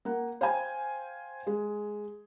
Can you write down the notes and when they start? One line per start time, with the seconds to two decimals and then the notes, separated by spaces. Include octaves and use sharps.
0.05 A#3 F#5
0.41 C5 F5 G5 G#5
1.47 G#3